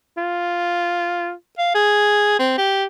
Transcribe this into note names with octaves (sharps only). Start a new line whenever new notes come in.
F4
F5
G#4
C4
G4